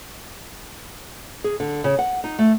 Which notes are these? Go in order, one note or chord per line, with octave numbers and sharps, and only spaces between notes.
G#4
D3
C#3
F#5
D#4
A3